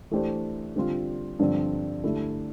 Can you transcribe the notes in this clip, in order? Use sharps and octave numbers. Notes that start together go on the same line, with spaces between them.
E3 A3 D4 G4 C5
D3 G3 C4 F4
G2 D3 F3 C4
D3 A3 E4 G4